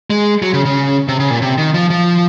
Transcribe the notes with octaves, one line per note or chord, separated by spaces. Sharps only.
G#3
F#3
C#3
C#3
C3
C#3
A#2
C3
D#3
F3
F3